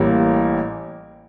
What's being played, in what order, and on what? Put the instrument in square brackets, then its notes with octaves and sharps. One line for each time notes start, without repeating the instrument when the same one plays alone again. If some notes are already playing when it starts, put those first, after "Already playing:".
Already playing: [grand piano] A1 A2 G3 A#3